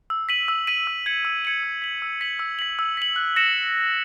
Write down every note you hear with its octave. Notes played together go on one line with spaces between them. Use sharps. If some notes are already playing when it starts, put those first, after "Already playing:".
E6
B6 D#7 F#7
E6
B6 D#7 F#7
E6
G#6 C#7 F#7
E6
G#6 C#7 F#7
E6
B6 F#7
E6
B6 F#7
E6
B6 F#7
E6
B6 F#7
F#6
A#6 C#7 E7